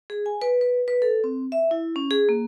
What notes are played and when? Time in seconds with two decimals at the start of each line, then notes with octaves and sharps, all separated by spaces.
0.10 G#4
0.26 G#5
0.42 B4
0.61 B4
0.88 B4
1.02 A4
1.24 C4
1.52 E5
1.71 E4
1.96 C#4
2.11 G#4
2.29 A#3